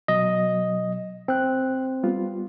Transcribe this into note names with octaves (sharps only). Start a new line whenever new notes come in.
B2 F#3 D#5
C#2 C4 F#6
G3 B3 F4